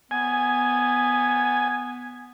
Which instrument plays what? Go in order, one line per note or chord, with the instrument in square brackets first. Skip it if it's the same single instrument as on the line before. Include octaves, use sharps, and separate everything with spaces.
[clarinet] B3 [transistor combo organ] G#5